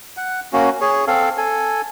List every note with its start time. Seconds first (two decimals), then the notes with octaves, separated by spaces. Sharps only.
0.17 F#5
0.53 A#3 C#4 F#4
0.81 G#4 C#5
1.07 C4 A4 F5
1.38 A4 G#5